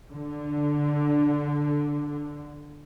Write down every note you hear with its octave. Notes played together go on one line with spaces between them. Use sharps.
D3